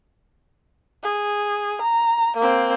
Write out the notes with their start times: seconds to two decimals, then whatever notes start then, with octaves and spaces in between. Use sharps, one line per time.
1.03 G#4
1.82 A#5
2.37 A#3 C4